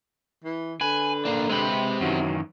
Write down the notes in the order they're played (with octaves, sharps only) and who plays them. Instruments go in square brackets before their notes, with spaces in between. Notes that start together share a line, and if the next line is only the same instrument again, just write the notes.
[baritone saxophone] E3
[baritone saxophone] D3 [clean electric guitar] B4 [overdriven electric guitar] G#5
[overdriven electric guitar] A#3 D4
[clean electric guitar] G#3 B4 [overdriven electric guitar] C4 G4
[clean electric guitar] F#2 D#3 E3 [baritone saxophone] F#3